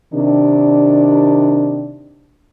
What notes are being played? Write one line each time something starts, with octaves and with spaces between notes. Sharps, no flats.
C3 D#3 D4